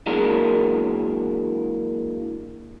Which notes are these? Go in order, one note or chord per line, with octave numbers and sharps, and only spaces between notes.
E3 F#3 G#3 A#3 D4 A#4